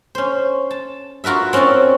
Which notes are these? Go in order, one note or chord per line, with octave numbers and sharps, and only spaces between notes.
C#4 C5
A5
F4 F#4 A#4 B4 E5
C4 C#4 E4 F#4 D5